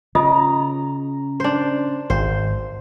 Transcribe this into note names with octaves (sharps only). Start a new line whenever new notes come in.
C#3 F4 D#5 A#5 D#6
D4 C5
G#1 C5